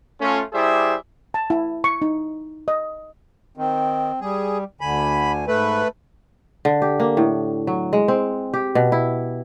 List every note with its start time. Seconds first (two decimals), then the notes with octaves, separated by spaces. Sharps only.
0.20 A3 C#4 F4
0.53 G3 E4 G#4 C5 D5 E5
1.34 A5
1.50 E4
1.84 C#6
2.02 D#4
2.68 D#5
3.57 D#3 C4
4.21 G3 G#4
4.81 D2 D3 G#5 B5
5.48 G#2 A3 B4
6.65 D3
6.82 G4
7.00 A#3
7.17 A2
7.67 F#3
7.93 G#3
8.08 C4
8.54 G4
8.75 B2
8.92 E4